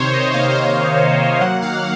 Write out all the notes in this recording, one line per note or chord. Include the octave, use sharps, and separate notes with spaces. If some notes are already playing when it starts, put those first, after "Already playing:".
Already playing: C3 D#3 C5 C#5
D#3 D#5
A#3 F5
D#3 D#5
D#3
C3 F5
A#3
F#3 F#5
D#3 F5